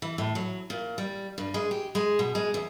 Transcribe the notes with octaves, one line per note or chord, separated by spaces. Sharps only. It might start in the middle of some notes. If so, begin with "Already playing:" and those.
E3
A2
F#3
A#2
G3
G2
G#3
G4
G#3
B2
G#3
E2